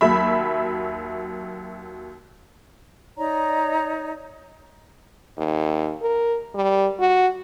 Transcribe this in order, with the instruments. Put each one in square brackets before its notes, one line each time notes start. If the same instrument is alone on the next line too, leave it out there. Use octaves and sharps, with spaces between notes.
[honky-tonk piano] D#2 F#3 E5 B5
[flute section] D#4 C#5 D5 A#5
[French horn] D#2
A#4
G3
F#4